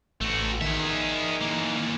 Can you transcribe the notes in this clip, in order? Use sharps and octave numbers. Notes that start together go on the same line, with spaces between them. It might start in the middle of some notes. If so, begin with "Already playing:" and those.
A1 A3 F#4
D#3 G#4 E5
E3 A#3